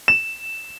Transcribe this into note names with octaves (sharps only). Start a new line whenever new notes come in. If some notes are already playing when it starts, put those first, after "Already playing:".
E7